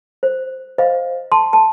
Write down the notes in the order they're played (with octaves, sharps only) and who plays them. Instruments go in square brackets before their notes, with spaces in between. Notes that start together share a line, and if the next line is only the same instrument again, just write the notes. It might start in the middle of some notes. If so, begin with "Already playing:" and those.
[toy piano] C5
[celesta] C5 F5 [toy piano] D#5
[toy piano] A5 [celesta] C6
[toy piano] A5